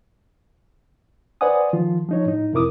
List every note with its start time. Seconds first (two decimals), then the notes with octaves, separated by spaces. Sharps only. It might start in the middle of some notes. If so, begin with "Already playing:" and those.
1.41 B4 C5 D5 F#5 G#5 D#6
1.73 D#3 F3 F4
2.09 F3 D#4 C#5
2.26 A2 D#4
2.53 F2 C3 E4 A#4 D6 D#6